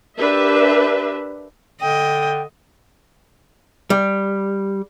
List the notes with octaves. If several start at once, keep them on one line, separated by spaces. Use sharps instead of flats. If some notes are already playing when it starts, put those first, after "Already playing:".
D4 G4 A#4 B4 E5
D3 D#5 G5
G3